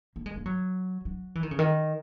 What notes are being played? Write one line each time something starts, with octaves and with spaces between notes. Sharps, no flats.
A#3
G#3
A#3
F#3
F#3
E3
D#3
C#3
D#3